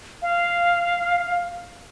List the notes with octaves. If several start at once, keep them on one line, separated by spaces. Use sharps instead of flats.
F5